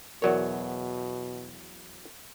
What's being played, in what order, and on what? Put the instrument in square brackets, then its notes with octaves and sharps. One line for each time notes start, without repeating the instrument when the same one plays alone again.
[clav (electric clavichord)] E2 F#3 C#5 [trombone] B2 [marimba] A#4 D5